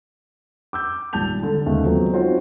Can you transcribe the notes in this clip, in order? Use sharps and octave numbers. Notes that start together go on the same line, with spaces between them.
D6 E6 G6
G#1 A#2 G3 A5 G6 F7
D3
D#2 G#2 C#3 A3
F3 F#3 G#3 B3 C4 A4
C4 D#4 F4 F#4 C5 C#5